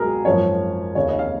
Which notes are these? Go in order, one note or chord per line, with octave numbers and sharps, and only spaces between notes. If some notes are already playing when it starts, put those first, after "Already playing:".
Already playing: C#2 B2 F#3 G#4 A#4
G#1 F#2 F3 C#5
F1 D#2 C#3 C#5
D#5
F5